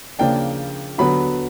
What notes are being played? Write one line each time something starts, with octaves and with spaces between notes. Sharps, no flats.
C#3 F3 A#3 D4 G5
D3 F#3 B3 B5